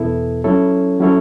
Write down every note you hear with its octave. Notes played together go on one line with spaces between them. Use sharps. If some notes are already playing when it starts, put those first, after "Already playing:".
Already playing: E2 B2 B3 E4 A4
F#3 C#4 E4 A4 C#5
F#3 C#4 E4 A4 C#5